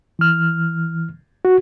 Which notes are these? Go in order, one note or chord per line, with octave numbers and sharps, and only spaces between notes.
E3 F6
F#4